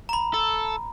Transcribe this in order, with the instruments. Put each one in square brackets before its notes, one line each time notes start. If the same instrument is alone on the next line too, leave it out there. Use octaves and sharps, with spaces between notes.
[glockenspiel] A#5 B5
[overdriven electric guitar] A4